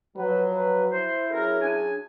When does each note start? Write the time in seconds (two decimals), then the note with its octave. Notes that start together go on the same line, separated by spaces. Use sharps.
0.17 F3 F#3 B4
0.54 B4
0.92 E4 C5
1.31 F#3 C#4 G#4 A#4
1.61 D4 G#5